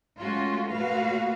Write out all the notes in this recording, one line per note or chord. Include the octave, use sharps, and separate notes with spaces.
G#3 A3 C#4 F4 F#4
A#2 A3 F#4 B4 F5